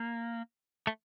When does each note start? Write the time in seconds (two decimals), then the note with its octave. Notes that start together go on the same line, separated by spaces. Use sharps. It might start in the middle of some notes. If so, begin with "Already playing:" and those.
Already playing: A#3
0.87 A3